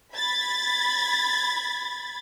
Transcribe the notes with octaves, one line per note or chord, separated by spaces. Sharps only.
B5 G#6 A6